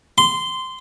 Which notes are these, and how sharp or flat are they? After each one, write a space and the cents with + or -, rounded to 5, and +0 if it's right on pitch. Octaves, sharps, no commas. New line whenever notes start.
C6 -15